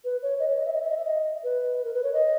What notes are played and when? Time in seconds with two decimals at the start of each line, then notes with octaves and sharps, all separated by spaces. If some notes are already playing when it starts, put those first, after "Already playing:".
0.05 B4
0.22 C#5
0.39 D#5
0.48 C#5
0.57 D#5
0.65 E5
0.74 D#5
0.82 E5
0.90 D#5
0.97 E5
1.05 D#5
1.44 B4
1.85 A#4
1.94 B4
2.03 C#5
2.13 D#5